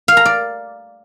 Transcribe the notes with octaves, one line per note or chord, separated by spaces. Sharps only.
F5
A#5
D5